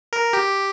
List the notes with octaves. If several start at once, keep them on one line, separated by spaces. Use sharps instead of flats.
A#4
G4